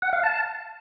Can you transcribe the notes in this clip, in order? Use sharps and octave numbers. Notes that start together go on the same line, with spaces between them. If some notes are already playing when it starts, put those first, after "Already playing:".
F#5
F5
A5